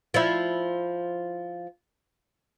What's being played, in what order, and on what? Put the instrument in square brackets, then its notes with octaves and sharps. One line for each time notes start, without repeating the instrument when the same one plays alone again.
[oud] F3 E4